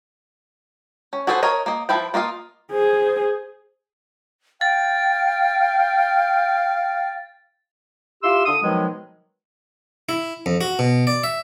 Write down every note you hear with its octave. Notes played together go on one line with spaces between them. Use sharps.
C#4
F#4 G#4 A4 B4 C5
A#4 C#5 D#5
A#3 D#5
F3 E4 B4 G5
A#3 F4 D#5 F5
G#4 C5
F5 G5 A6
E4 F4 G4 C6 E6
D3 D#6
B2 D#3 F3 F#3 G#3
E4
F2
F#4
B2
D5
E5